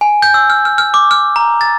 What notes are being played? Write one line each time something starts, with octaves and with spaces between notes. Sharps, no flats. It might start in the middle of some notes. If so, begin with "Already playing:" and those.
G#5
G6
E6
F6
F6
F6
D6
F6
A#5
A6